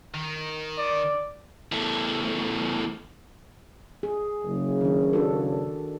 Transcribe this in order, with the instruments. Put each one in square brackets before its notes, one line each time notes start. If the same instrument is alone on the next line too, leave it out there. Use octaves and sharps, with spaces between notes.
[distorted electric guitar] D#3
[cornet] D5
[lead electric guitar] E2 A3
[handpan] G#4
[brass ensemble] F#1 C#3
[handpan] D#3 D4
D4 F#4 A4